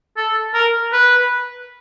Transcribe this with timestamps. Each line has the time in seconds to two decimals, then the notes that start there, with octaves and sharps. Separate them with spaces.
0.17 A4
0.54 A#4
0.93 B4